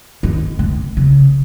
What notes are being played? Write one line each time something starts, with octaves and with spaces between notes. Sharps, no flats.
D#3
D3
C#3